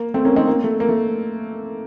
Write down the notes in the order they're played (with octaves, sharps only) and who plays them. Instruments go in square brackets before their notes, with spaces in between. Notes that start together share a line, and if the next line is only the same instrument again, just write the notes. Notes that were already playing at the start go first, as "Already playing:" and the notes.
Already playing: [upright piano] A#3
A3 C4
A#3 C#4
C4 D#4
A#3
A3
A#3
A3